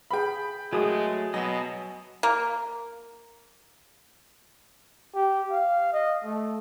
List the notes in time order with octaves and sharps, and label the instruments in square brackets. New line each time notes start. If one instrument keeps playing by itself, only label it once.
[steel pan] G#4 B4 F5 [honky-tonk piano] G5 B5
[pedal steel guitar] F#3 A3 D#6 [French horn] G#3 [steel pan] F#4 G#4 A#4
[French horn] B2 [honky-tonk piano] F#3 [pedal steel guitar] D#5 G#5 D#6
[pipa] A#3
[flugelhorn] G4
F5
D#5
A3